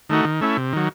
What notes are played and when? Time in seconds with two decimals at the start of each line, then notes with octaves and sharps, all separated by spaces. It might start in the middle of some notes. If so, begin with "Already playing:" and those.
0.09 D#3 A3 D#4 F#4
0.25 D#3
0.41 A3 C#4 E4
0.57 C3
0.73 D#3 F#3